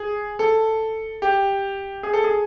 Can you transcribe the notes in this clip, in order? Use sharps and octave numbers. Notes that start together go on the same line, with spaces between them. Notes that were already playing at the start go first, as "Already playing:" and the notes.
Already playing: G#4
A4
G4
G#4
A4
G#4